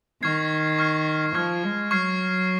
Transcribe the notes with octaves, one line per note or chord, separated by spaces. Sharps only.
D#3 C#6 F6 G#6 C7
C#6 F6 G#6 C7
F3 C#6 F6 G#6 C7
G#3
F#3 C#6 F6 G#6 C7